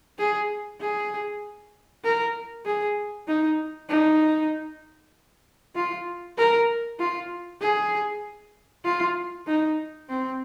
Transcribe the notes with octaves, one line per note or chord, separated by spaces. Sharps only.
G#4
G#4
A#4
G#4
D#4
D#4
F4
A#4
F4
G#4
F4
D#4
C4